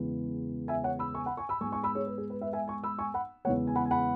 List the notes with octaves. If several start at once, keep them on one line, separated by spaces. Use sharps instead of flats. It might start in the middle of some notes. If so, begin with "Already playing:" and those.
Already playing: E2 C#3 E3 G#3 B3
E5 G#5
C#5 F#5
B5 E6
G#5 C#6
F#5 B5
G#5 C#6
B5 E6
G#2 G#3 B3 G#5 C#6
G#5 C#6
B5 E6
G#4 C#5
B4
G#4
B4
B4 E5
E5 G#5
G#5 C#6
B5 E6
G#5 C#6
F#5 B5
E2 C#3 G#3 B3 C#5 F#5
G#5
F#5 B5
G#5
F#5 B5